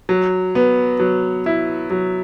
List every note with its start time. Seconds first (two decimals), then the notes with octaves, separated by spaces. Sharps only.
0.09 F#3
0.55 B3
1.00 F#3
1.46 E4
1.91 F#3